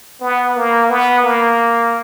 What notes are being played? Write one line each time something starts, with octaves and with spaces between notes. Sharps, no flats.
B3
A#3
B3
A#3